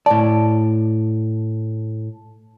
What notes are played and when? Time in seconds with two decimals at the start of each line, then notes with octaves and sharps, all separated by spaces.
0.06 A2 D5 A5